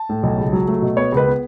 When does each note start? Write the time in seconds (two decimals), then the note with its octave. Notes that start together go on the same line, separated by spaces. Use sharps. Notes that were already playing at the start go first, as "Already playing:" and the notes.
Already playing: A5
0.09 A2
0.23 B1
0.38 C#2
0.53 F#3
0.68 A3
0.82 B2
0.97 B3 C#5
1.12 C#2 B4
1.26 B3